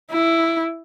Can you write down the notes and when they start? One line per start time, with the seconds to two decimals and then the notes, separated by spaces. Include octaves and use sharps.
0.11 E4